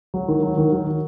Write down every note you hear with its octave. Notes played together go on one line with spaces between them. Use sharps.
F#3
D#3
F#3
D#3
F#3